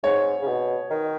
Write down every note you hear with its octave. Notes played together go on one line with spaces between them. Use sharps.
G#2 C#5
C#3
B2
D#3